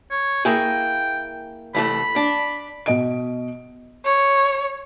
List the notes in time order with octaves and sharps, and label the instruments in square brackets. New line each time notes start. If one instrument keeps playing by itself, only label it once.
[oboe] C#5
[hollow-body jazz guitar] A#3 E4 G#4 [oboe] G5
[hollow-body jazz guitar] C2 E3 A3 [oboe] B5
[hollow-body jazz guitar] D4
[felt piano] B2 D#5 D7
[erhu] C#5